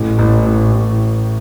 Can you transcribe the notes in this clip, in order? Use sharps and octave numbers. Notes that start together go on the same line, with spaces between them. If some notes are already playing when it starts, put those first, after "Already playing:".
Already playing: A1 A2
A1
A1
A1